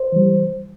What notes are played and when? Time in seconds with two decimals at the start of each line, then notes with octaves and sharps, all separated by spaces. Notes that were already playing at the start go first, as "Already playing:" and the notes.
Already playing: C5
0.12 E3 G3